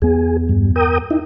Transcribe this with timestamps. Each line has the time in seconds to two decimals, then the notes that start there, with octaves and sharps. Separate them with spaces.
0.02 E2 B3 G#4
0.49 G2
0.76 A#4 G5 D#6
1.11 D#4 E4